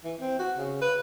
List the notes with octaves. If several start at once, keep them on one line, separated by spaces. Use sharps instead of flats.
E3
C4
F#4
C#3
B4